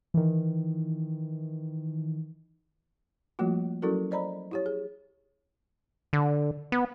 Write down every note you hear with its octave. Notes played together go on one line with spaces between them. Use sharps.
D#3 E3
F3 G3 A3 A#3 F4 F#4
F#3 C#4 E4 F#4 A4 A#4
C5 D5 D#5 A#5 B5
E4 G4 C#5
G#4
D3
B3